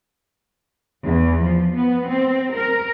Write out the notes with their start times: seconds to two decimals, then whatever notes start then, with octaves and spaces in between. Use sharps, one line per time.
1.05 E2
1.44 F3
1.77 B3
2.10 C4
2.56 A#4